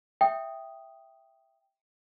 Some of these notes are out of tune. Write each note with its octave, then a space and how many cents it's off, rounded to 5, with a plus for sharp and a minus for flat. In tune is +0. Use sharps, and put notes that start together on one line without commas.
E5 +0 G5 +0 D#6 +0